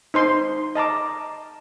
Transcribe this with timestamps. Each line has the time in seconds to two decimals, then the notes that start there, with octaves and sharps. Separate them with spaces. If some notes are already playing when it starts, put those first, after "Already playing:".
0.14 D#4 C5 C6
0.75 D#5 A5 A#5 D6